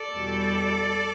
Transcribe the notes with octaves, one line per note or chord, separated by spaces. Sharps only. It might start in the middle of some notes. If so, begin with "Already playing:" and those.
Already playing: A4 D5
E2 B2 G3